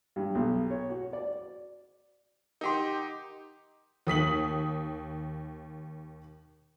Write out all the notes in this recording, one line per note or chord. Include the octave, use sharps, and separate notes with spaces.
G2
B1
C#5
F#4
D5
D#4 G4 A#4 F#5 C6
D#2 D#6 B6 F#7